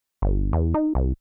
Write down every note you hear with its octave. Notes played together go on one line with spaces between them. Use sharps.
G1
E2
D#4
C2